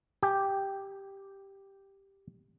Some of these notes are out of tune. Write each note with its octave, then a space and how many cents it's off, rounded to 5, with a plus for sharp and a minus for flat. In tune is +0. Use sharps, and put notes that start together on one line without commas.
G4 +0 G#5 +0